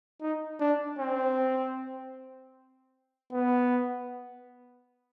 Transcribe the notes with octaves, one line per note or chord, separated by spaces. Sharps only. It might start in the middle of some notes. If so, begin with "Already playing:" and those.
D#4
D4
C4
B3